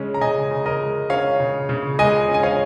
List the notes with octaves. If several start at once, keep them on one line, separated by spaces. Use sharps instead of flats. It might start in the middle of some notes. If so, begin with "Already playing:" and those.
Already playing: C#3 G#3 C#4
A#5
C#3 D#5 G#5
C#3
A#4 D#5
G#3
C#4 C#5 F5
C#3
C#3
G#3 D#5 G#5
C#4
G#5
C#5 F5